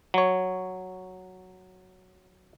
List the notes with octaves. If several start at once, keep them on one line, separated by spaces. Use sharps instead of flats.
F#3 C#5